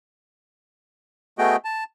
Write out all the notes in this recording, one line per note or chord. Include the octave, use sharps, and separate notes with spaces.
A3 B3 F#4 G#4 D#5 G5
A5